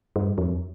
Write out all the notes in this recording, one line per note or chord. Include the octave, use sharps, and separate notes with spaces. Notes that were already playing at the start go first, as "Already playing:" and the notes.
G2
F2